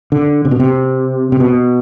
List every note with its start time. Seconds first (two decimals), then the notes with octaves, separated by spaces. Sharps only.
0.12 D3
0.45 C3
0.51 B2
0.60 C3
1.32 C3
1.40 B2